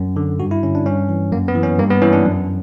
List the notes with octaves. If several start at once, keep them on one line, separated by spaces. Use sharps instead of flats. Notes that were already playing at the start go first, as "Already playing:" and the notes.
Already playing: F#2
D3
G2 F#4
E4
D3 C#4
D4
G2 C#4
E3
F#2 A#3
B3
E3
C#4
G2 A#3
B3
E3 C#4
D4
F#2